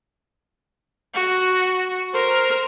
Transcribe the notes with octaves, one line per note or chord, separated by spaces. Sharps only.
F#4
A#4 C5